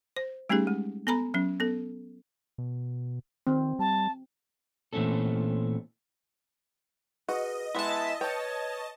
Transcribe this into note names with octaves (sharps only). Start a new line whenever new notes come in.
C5
G3 A3 C#4 D#4 G4 G#4
G#3
B3 A4 G#5 A#5 B5
F#3 C#4
B3 A4
B2
D#3 C4
G3 A5
A#2 E3 A3 C4 C#4 A4
F#4 G#4 B4 D#5
G#3 B3 E4 E5 A5 C6
B4 C#5 D#5 G5 A5